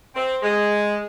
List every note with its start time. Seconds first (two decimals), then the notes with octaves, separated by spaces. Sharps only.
0.15 C4
0.43 G#3